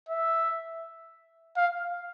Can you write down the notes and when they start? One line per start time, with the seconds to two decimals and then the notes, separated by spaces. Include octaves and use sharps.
0.09 E5
1.57 F5